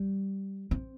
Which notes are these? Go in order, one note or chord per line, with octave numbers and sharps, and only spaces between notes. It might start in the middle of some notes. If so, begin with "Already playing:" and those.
Already playing: G3
C4